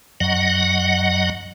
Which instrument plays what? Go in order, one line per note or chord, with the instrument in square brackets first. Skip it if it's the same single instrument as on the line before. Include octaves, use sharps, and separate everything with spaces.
[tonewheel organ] F#2 F#3 D#5 F#5